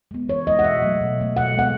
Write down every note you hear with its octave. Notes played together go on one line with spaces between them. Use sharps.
G#3 B3
E3 C#5
G#3 B3 D#5
F#5
B2 E5
F#3 A3
B2
F#3 A3
B2 F#5
G#3 B3 F#5